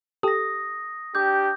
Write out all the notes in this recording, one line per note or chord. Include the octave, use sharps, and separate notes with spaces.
G4 A4 D#6 A#6
D4 G4 D6 G6